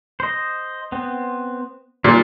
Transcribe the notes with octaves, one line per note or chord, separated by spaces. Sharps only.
C5 D#5
B3 C4
A#2 D#3 G3 D4